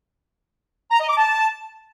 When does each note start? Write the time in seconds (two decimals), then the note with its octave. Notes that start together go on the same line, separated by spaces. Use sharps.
0.91 A#5
1.00 D#5
1.09 D6
1.17 A5